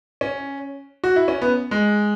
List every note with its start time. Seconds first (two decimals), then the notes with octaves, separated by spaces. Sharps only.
0.21 C#4
1.04 F#4
1.16 E4
1.28 C#4
1.42 B3
1.71 G#3